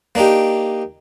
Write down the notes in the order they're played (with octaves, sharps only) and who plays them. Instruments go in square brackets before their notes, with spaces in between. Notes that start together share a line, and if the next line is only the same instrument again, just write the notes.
[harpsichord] A#3 D4 D#4 G4